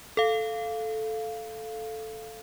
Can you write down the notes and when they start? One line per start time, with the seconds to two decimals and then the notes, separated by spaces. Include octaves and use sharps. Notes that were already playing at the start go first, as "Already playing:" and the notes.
0.17 A4 F5